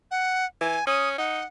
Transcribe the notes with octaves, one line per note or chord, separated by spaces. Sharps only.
F#5
E3 G#5
C#4 D#6
D#4 F#5